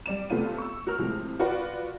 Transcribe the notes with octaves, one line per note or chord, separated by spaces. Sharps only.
G3 D5 E7
C3 A3 B3 F4 D#7
C#6 E6
F#4 A#4 F6
A2 C3 F3 G#3
F4 F#4 A#4 B4 D5 F#5